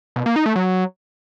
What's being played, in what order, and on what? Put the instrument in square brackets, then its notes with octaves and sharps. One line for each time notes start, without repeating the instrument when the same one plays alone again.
[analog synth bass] B2
A#3
D#4
A3
F#3